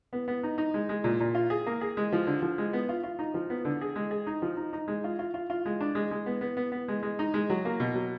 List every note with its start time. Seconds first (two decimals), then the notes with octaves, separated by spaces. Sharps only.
0.13 B3
0.28 B3
0.43 D#4
0.58 D#4
0.74 G#3
0.89 G#3
1.04 A#2
1.20 A#2
1.35 F4
1.50 G#4
1.66 A#3
1.81 G#4
1.97 G#3
2.13 F3
2.27 D3
2.42 F3
2.58 G#3
2.73 B3
2.89 F4
3.03 F4
3.19 D#4
3.34 F3
3.50 B3
3.65 D3
3.81 G#4
3.96 G#3
4.11 G#4
4.27 D#4
4.42 F3
4.57 D#4
4.73 D#4
4.88 G#3
5.04 F4
5.19 F4
5.34 F4
5.50 F4
5.66 G#3
5.80 D4
5.95 G#3
6.11 G#3
6.26 B3
6.41 B3
6.57 B3
6.72 B3
6.88 G#3
7.03 G#3
7.19 D#4
7.34 G#3
7.50 F#3
7.65 A#3
7.80 B2
7.95 F#3